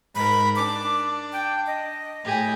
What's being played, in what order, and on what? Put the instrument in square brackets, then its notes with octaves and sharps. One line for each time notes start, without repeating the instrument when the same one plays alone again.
[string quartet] G#2 A#4 [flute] B5
[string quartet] D4 [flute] D6
[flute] G5
D#5
[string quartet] A2 G4 G#4